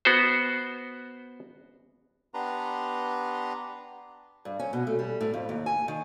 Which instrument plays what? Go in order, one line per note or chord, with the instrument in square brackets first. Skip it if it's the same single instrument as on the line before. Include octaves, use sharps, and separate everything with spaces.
[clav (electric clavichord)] B3 F#4 C5
[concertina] B3 D4 G4 B4 A#5 C6
[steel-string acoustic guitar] G2
C#4
B2
A3
G3
A2
F2
D#2
G#5
D#3